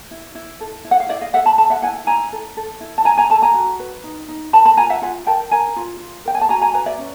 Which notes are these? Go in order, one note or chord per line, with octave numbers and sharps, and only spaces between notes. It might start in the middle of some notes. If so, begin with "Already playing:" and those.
E4
E4
A4
E4
F#5
F5
E4 D5 E5
D#5 F5
A4 E5 F#5
A5 B5
A4 A5 B5
E5 F#5
E4 F#5 G#5
E4 G#5 A#5
A4
A4
E4
A5
E4 G#5 A#5
G#5 A#5
A4 A5 B5
G#5 A#5
F#4
B4
D#4
D#4
A#4 A5 B5
A5 B5
F4 G#5 A#5
E5 F#5
F4 F#5 G#5
A#4 G5 A5
A#4 G#5 A#5
F4
F4
A#4 G5
G#5
A5
F#4 G#5 A#5
G#5 A#5
B4 G#5 A#5
D5 E5
C#4